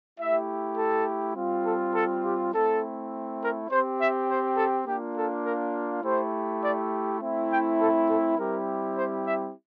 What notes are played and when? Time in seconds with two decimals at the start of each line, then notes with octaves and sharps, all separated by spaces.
0.19 A3 E4 G4 E5
0.77 A4
1.36 G3 C4 F4
1.65 A4
1.94 A4
2.24 G4
2.53 A3 C4 E4 A4
3.41 A#4
3.70 C4 G4 C5
3.99 E5
4.29 C5
4.57 A4
4.86 A#3 D4 F4 G4
5.16 A4
5.45 A#4
6.03 A3 E4 G4 C5
6.62 D5
7.21 A3 C4 E4
7.50 G5
7.79 A4
8.07 A4
8.38 G3 C4 E4 G4 A#4
8.95 C5
9.25 E5